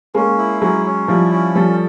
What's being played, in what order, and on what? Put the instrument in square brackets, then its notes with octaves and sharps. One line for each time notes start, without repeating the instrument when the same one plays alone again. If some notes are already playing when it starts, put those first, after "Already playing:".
[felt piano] G#3 A#3 [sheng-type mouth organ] C#4
[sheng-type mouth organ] E4
[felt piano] F#3 G#3 [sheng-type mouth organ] C#4
[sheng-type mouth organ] C#4
[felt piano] F3 G3 [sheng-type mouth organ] E4
[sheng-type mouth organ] C#4
[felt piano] F3 G3 [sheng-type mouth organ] A4